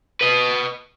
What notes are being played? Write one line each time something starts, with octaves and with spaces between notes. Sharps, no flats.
B4 D#5